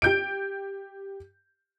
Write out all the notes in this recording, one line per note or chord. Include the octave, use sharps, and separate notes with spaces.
G4 G6 D7